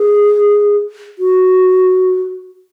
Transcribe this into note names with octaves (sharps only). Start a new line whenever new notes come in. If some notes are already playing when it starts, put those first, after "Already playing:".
Already playing: G#4
F#4